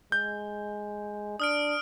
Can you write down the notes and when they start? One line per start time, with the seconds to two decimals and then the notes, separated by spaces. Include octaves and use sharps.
0.12 G#3 G6
1.40 D4 D#6 F6 D7